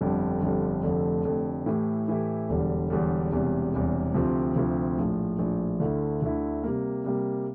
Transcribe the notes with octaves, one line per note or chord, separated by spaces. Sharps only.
G1 F2 D3 G3
G1 F2 D3 G3
F1 F2 D3 A3
F1 F2 D3 A3
A2 E3 A3 E4 G4
A2 E3 A3 E4 G4
E1 E2 D3 G3
E1 E2 D3 G3
E1 E2 C3 G3
E1 E2 C3 G3
D2 C3 F3 C4 G4
D2 C3 F3 C4 G4
A#1 A2 F3
A#1 A2 F3
D2 D3 A3 E4
D2 D3 A3 E4
C3 G3 A#3
C3 G3 A#3